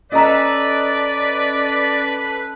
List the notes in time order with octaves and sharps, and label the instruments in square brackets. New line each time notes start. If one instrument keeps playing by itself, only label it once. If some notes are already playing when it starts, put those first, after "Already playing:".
[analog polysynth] C#4 A4 A5 [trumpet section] B4 [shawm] D5 [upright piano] D#5 A#5